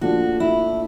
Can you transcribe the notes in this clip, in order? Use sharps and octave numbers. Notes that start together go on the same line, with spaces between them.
A#2 F3 A3 D4 F4 F#4
E4